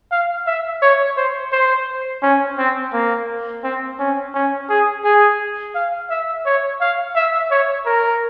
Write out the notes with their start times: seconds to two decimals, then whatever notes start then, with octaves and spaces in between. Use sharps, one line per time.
0.11 F5
0.46 E5
0.82 C#5
1.17 C5
1.52 C5
2.22 C#4
2.58 C4
2.93 A#3
3.64 C4
3.99 C#4
4.34 C#4
4.69 G#4
5.04 G#4
5.75 F5
6.10 E5
6.46 C#5
6.81 F5
7.16 E5
7.51 C#5
7.86 A#4